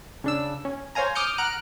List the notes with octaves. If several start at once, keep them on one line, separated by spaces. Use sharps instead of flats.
C#3 D4 E6
C#4
C5 C#5 F5 G#5 A#5
D6 D#6 F6 G6 C#7
F#5 A#5 F6 F#6 D7